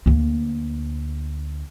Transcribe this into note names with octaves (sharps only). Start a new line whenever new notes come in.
D2 A#3